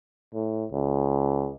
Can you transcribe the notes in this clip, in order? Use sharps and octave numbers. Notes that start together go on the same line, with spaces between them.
A2
C#2